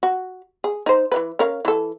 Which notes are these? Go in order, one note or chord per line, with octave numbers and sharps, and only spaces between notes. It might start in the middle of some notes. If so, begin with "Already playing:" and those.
F#4
G#4
D#4 C5
E3 F#3 B4
C#4 A#4 F5
E3 A4